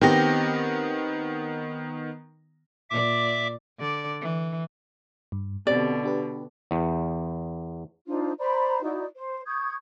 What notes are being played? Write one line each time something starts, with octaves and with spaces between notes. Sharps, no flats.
D#3 B3 C4 G4 A#6
A#2 D5 E5 D6
D3 D5
E3
G2
B2 D3 C4 G4 D5
D4 G4 B4
E2
D4 D#4 F4 C5
C5 D5 A#5 B5
D#4 E4 F#4 D5
C5
C#6 D#6 G6 G#6